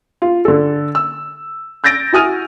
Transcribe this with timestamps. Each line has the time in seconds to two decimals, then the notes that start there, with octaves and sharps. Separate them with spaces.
0.22 F4
0.45 D3 A4
0.95 E6
1.84 E6 G6 A6 A#6 D7
2.13 E4 F#4 G#5 D#6 F6 D#7